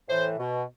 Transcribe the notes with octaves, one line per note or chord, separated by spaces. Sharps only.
A2 E3 C5
B2